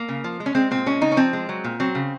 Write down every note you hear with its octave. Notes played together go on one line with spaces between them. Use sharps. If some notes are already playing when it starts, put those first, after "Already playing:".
Already playing: A#3
C#3
F3
G#3
C#4
G#3 C4
A#2 C4
G#3 C#4
C#3 D#4
C#4
F3 C4
G#3
F#3
A#2
F#3 C4
C#3